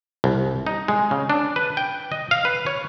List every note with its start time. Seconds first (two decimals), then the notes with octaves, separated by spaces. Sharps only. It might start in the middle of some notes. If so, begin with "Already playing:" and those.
0.24 C2
0.67 D#4
0.88 G#3
1.11 C#3
1.30 D4
1.56 B4
1.77 G5
2.12 D#5
2.31 F5
2.45 B4
2.66 C#5